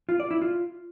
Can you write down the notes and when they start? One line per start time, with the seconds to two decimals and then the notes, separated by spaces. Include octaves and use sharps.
0.09 F4
0.20 D5
0.31 E4
0.42 F4